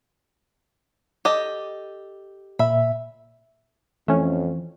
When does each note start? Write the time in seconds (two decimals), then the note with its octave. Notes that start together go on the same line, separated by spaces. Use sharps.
1.25 G4 A4 D#5
2.59 A#2 E5 B5
4.08 F2 E3 A3 C#4